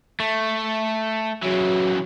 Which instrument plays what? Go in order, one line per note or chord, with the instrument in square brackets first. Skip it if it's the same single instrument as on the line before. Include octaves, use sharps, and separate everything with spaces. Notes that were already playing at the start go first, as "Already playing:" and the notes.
[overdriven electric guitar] A3
[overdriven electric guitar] C#3 E3 [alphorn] F#3